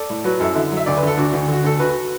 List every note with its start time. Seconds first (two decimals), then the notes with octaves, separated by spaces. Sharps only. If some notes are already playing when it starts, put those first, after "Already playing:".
Already playing: A4 D5
0.10 A2
0.24 F#3 F#4 B4
0.40 F#2 E4 A4
0.55 D3 E4
0.72 F#3
0.77 E5
0.86 D2 D5
0.97 B4
1.03 D3 A4
1.17 D2 D4 F#4
1.33 D2
1.48 D3 F#4
1.64 D2 A4
1.79 D2 F#4 B4